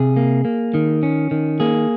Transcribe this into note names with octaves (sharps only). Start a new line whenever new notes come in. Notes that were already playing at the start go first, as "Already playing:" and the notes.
Already playing: C3 G#4
A#3
A#3
D#3
C#4
D#3
A#3 G#4